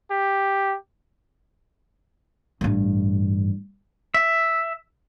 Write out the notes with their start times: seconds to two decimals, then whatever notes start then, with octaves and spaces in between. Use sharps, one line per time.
0.11 G4
2.61 A1 G2
4.14 E5